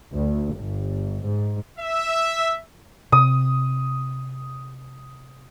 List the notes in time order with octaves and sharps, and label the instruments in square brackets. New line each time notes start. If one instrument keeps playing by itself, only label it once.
[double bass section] D2
G1
G#2
[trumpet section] E5
[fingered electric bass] C3 [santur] D#6